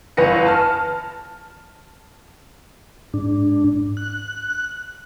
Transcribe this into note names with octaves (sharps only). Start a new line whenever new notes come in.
G1 E2 B4 A#6 C#7
A5 F6
G#2 D4
F#6